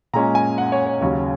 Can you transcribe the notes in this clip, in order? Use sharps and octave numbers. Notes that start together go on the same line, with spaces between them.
A#2 G#3 C#4 A#5
G#5
F#5
C#5
C#5
D#2 C#3 F#3 C#4 C#5